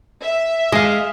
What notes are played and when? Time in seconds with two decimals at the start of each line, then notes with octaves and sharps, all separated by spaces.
0.22 E5
0.72 G#3 D#5 F5